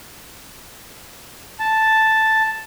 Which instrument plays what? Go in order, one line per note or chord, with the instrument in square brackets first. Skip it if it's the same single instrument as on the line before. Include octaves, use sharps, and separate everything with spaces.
[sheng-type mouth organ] A5